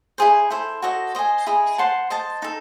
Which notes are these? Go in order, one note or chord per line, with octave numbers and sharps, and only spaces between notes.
E4 G#4 C5
E4 A4 C5
F#4 A4 C5 D#5
C5 D#5 G#5
E4 G#4 D#5
C5 F#5 A5 C6
C5 D#5 A5
D#4 A4